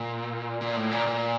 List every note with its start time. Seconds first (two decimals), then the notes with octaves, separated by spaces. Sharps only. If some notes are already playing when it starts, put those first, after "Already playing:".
Already playing: A#2
0.61 A#2
0.76 A2
0.91 A#2
1.06 A#2